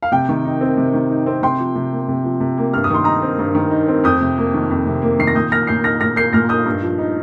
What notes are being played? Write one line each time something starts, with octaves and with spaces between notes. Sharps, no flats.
F5
C3 G5
D#3
D#4
C4
C3
D#3
D#4
C4
C3 G5 C6
F3
C3
A#3
C3
F3
C3
A#3
G2 F6
D#6
D#3 C6
D#4 A#5 D#6
C4
G2
D#3
D#4
C4
F2 D#6 G6
C3
A#3
D#3
F2
C3
A#3
D#3 C7
A#6
A#2 D#6 G6
A#3 F6 A#6
A#2 G6 C7
D#4 F6 A#6
A#2 F6 A#6
A#3 G6 C7
A#2 F6 A#6
D#4 D#6 G6
G2
F3
D#4